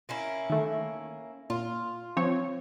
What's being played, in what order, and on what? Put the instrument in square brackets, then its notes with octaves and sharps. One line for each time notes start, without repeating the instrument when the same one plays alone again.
[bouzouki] A#3 C#4 E4
[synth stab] D#3 A3
[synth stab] A#2 [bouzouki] F4
[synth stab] F3 C4 C#5